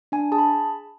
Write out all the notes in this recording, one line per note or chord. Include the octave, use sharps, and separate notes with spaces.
D4 G#5
G#4 A5
B5